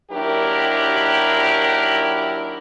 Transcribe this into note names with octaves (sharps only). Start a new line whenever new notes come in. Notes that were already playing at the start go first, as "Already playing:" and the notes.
D#2 F#3 D4 E4 G4 A#4